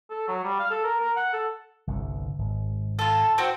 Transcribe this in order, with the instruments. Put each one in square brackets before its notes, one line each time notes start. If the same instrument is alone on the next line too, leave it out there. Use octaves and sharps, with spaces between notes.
[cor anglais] A4
F#3
G3
F5
A4
A#4
A#4
F#5
A4
[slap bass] G1 C2 D3
G#1
[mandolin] F4 A4
C4 F#4 C5